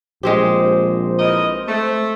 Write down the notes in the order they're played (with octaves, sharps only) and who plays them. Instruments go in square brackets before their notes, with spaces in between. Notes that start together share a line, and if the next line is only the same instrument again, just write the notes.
[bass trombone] A#1 [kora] G#3 C4 G4 [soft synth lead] C5
[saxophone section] E3 A#4 D#5
A3